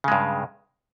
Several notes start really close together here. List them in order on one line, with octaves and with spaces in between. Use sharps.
C#3 G#3 G2